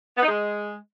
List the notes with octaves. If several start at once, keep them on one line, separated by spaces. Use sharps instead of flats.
B3
D#4
G#3